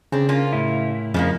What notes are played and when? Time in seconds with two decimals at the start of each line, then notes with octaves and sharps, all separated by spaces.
0.12 C#3 C4 D4
0.29 A#3 C#4 F4
0.53 A2 E4
1.14 F2 C#3 F3 A#3